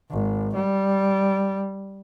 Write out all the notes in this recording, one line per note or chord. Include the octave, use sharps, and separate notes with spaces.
G#1
G3